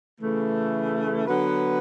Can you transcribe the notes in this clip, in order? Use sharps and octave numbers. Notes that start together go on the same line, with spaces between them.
C#3 E3 A3
D3 F#3 B3 F#4 B4